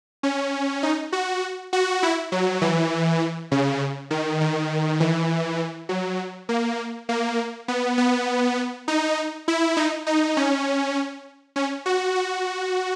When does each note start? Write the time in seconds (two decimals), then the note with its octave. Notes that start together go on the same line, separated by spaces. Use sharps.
0.23 C#4
0.83 D#4
1.13 F#4
1.73 F#4
2.03 E4
2.32 F#3
2.62 E3
3.51 C#3
4.11 D#3
4.41 D#3
5.00 E3
5.89 F#3
6.49 A#3
7.09 A#3
7.68 B3
7.98 B3
8.88 D#4
9.48 E4
9.77 D#4
10.07 D#4
10.37 C#4
11.56 C#4
11.86 F#4
12.15 F#4